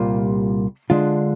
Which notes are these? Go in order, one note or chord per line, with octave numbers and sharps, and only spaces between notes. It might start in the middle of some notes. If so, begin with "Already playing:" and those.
Already playing: C2 A#2 G3 A#3 F4
D3 G#3 D4 F4